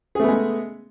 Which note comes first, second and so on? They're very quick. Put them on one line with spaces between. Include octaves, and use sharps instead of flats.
G#4 A3 B3 G#3